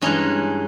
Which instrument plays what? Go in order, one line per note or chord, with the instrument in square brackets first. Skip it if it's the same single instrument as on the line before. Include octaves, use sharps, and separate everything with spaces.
[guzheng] G2 E3 G#3 C#4 D#4